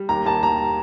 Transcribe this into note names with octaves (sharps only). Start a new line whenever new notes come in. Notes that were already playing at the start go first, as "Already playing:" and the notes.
Already playing: G3
D#2 A#5
D#2 A5
G3 A#5